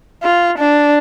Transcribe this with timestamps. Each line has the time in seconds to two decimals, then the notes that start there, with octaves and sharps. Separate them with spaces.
0.23 F4
0.58 D4